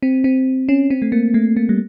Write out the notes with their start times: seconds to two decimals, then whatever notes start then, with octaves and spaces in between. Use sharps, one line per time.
0.03 C4
0.24 C4
0.69 C#4
0.90 C4
1.02 A3
1.12 A#3
1.34 A3
1.56 A#3
1.69 G3